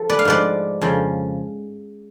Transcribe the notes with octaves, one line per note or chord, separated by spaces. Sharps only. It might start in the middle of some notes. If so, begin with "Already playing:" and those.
Already playing: F3 A4
B4 D5
F5
G#2 F3 B4 D5
F2 C#3 F3